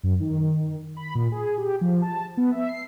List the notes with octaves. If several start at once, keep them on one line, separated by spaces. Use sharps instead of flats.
F#2
D#3
B5
A#2
G#4
G4
F3
A5
B3
E5
C7